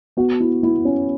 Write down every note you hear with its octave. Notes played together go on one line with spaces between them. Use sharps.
B3 F#4
E4
B3 E4
C#4